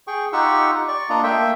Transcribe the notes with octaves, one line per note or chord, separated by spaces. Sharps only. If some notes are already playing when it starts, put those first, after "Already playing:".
G#4 G5 C#6
D#4 F4 G4 F#5 C#6 E6
D5 C#6
A#3 D4 F4 D#5 A#5
A3 A#3 E5 G5